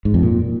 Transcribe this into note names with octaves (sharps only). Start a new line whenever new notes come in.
G#2
F2
A#2